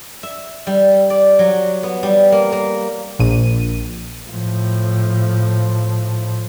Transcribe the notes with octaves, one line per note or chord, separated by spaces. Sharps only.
E5
G3
D5
F#3
B3
G3
A#3
A#3
A#1 A#2 D#7
A2 F3